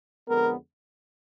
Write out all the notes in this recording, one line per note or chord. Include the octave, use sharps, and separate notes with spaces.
F2 D3 G#3 B3 A#4